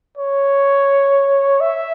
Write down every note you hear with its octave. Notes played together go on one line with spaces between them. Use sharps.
C#5
E5